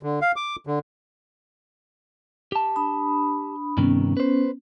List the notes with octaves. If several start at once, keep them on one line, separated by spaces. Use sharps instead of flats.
D3
F5
D6
D3
G4 A5
D4 B5 D#6
G2 C3 D#3 B3 C#4
B4 C5